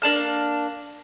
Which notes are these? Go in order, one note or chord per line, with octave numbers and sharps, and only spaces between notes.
A#3 D4 A5 F6